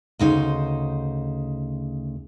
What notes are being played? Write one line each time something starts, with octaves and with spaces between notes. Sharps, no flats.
D2 C#3 D#4 C5